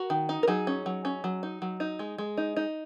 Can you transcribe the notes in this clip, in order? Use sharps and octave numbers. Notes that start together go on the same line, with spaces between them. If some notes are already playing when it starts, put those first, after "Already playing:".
Already playing: F#4 A#4
D#3
D#4
A#4
F#3 D#4 G#4
C#4
F#3
C#4
F#3
D#4
F#3
D#4
G#3
G#3
D#4
D#4